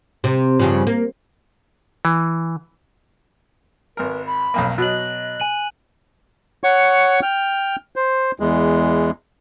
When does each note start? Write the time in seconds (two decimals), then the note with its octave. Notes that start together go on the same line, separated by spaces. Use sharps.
0.24 C3
0.59 G2 C#3 F3
0.87 A#3
2.05 E3
3.97 G#1 A#4 B4
4.26 B5
4.54 B1 F2 A#3
4.78 B2 F#3 D#5 F#6 F#7
5.40 G#5 D#7 F#7
6.64 C#5 F#5 C#6
7.22 G5 F6
7.96 C5
8.40 E2 G#3